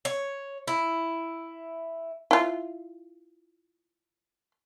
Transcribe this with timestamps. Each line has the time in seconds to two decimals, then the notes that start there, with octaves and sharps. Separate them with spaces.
0.05 C#5
0.68 E4
2.31 E4 F4